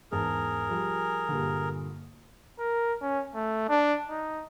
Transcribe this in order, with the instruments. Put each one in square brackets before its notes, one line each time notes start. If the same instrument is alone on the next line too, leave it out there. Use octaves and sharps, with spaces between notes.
[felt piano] E2 G#2 A5 [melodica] G#4 A#4
[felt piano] F3 G3
G2 A#2 D3
[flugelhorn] A#4
C#4
A3
D4
D#4